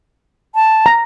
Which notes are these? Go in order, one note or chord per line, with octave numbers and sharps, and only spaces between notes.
A5
A#5